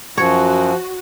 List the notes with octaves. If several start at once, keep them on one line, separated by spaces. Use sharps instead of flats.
F#2 F3 F#4 C#5